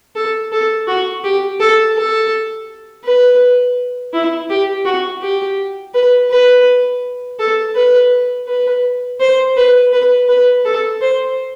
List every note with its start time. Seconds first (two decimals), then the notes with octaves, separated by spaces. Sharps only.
0.15 A4
0.52 A4
0.87 F#4
1.24 G4
1.60 A4
1.96 A4
3.05 B4
4.13 E4
4.50 G4
4.85 F#4
5.22 G4
5.94 B4
6.31 B4
7.39 A4
7.75 B4
8.47 B4
9.20 C5
9.57 B4
9.93 B4
10.28 B4
10.65 A4
11.01 C5